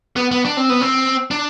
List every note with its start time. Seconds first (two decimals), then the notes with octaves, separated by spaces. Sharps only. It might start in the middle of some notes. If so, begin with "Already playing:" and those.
0.16 B3
0.31 B3
0.45 D4
0.57 C4
0.70 B3
0.81 C4
1.31 D4